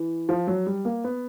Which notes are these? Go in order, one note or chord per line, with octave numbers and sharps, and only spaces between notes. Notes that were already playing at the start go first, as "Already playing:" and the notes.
Already playing: E3
F3
F#3
G3
A#3
B3